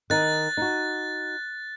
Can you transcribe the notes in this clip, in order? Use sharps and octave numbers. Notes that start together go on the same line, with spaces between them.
D#3 D#4 F#6 A6
D#4 F#4